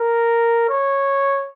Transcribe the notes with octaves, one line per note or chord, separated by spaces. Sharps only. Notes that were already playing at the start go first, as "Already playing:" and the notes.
Already playing: A#4
C#5